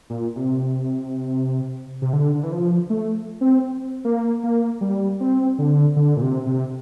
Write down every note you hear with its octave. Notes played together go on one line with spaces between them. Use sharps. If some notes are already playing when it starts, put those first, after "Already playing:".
A#2
C3
C3
D3
D3
E3
F3
A3
C4
A#3
A#3
G3
C4
D3
D3
A#2
C3
C3